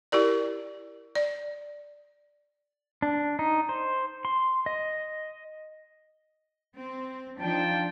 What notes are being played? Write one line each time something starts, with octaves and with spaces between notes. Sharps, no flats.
E4 G4 A#4 D5
D5
D4
D#4
C5
C6
D#5
C4
F3 D4 D#4 F4 G5 A5